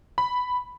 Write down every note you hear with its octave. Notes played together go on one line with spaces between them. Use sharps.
B5